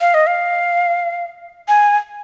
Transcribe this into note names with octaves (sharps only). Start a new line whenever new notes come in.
F5
D#5
F5
G#5